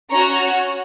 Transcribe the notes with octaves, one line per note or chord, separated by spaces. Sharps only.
C#4 F#4 A#5 C#6